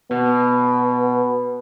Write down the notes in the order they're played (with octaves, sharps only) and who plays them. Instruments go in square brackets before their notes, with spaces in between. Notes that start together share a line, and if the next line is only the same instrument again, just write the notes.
[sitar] B2 [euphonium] B3